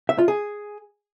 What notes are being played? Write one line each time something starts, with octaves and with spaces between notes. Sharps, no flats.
E5
F4
G#4